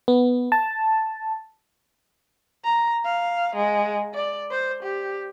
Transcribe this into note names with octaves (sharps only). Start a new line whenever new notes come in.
B3
A5
A#5
F5
G#3
D5
C5
G4